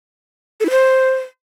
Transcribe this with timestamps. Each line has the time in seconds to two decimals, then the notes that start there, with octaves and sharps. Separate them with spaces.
0.60 A4
0.65 E4
0.70 C5